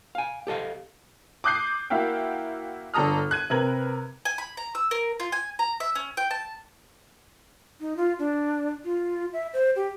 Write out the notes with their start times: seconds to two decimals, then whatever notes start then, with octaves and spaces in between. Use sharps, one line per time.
0.15 F5 G#5
0.47 G4 A4 D#5 F5
1.44 D6 D#6 F#6 G6 C7
1.90 A#3 E4 F#4 E5 F5 G5
2.94 G1 D4 A4 A#5 D#6 F6
3.31 F#6 G#6 D#7
3.50 C3 A#4 B4 G#6 F#7
4.25 G#5
4.38 B5
4.57 A#5
4.75 E6
4.91 A#4
5.20 F4
5.32 G#5
5.59 A#5
5.80 E5
5.95 C#4
6.17 G5
6.31 A5
7.81 D#4
7.97 F4
8.19 D4
8.85 F4
9.33 E5
9.53 C5
9.76 G4